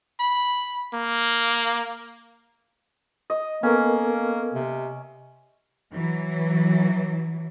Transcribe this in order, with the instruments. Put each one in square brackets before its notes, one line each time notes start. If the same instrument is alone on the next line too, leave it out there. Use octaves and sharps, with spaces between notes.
[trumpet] B5
A#3
[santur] D#5
[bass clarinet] A#3 [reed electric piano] B3 A4 A#4 [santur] C#4
[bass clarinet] C3
[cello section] E3 F#3